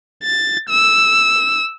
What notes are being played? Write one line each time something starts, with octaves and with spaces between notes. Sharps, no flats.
A6
E6